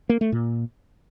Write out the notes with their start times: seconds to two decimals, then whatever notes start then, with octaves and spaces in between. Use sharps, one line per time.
0.09 A#3
0.21 A3
0.32 A#2